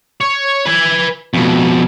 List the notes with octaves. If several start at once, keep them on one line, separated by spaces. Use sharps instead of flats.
C#5
B4 G#5
F2 B2